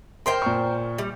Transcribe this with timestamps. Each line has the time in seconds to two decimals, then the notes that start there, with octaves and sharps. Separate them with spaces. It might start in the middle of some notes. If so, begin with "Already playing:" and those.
0.26 A#4 C5 G5 C6
0.42 A#2 C#6
0.98 G3